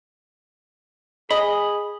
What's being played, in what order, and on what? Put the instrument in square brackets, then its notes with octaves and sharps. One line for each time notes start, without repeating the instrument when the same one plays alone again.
[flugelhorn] G#4 [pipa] D#5 [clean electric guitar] B5